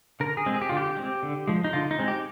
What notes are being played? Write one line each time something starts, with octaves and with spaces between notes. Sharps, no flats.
D3 A#4
G#4
G#3 C4
G#4
G4
D3 F4
G4
G#3 C4
D3
F3 G#3
D#4
D3 F4
D#4
G#3 C4
G4